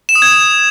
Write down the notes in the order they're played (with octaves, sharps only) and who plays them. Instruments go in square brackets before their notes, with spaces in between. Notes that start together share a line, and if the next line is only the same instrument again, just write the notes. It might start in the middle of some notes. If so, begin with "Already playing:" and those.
[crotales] E7
D#6
G#6